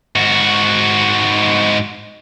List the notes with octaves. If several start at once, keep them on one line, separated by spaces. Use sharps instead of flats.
G#2 F#4